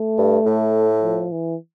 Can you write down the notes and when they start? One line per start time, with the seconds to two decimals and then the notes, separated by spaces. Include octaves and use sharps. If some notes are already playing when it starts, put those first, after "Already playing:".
Already playing: A3
0.18 G2
0.46 A2
1.03 F3
1.32 E3